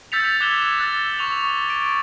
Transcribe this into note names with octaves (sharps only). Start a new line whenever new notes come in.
E6 G6 A6 B6 C#7 F7
D6 F#6 G#6 B6 E7 G7
E6 F#6 A6
C#6 F7
D7